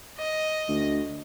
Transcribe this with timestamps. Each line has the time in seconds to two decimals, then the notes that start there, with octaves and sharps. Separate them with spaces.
0.19 D#5
0.68 D2